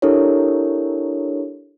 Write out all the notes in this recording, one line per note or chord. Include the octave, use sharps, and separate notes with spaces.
D4 E4 G4 A4 A#4 C#5